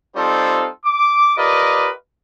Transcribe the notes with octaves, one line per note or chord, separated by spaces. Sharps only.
G3 C4 D#4 F4 A4 C5
D6
F4 G4 A#4 B4 D5 D#5